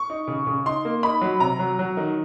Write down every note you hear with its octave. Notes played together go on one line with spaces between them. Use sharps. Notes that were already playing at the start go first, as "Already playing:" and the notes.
Already playing: C#6
D#4
C#3
C#3
D#4 C6
A#3
D#4 B5
F#3
C3 A#5
F#3
F#3
D#3